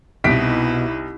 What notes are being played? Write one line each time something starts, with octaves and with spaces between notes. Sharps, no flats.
C2 B2 D#4 E4 B6 D7